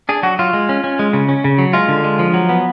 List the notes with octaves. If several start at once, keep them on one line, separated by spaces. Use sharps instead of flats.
D4 G#4
F#3 F#4
F#3 F4
G#3
C#4
C#4
G#3
C#3
C#4
C#3
F#3
G#3 F4
D3
G#3
F3
F#3
B3